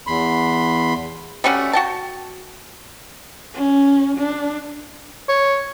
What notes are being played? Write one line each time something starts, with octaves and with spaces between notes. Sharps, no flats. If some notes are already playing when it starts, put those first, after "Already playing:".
E2 B5 C6
G3 A3 C#4 F#4
F#4 G5 A5
C#4
D4
C#5